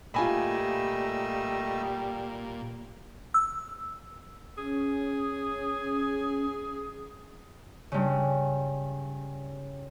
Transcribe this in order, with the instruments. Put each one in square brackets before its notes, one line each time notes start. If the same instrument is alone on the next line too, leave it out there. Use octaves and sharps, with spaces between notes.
[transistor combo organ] A#2 [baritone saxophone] G3 [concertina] A3 D#5 E6 [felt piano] F4 G#5 B5
[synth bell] E6
[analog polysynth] C#4 [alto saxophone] G#4
[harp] G2 C#3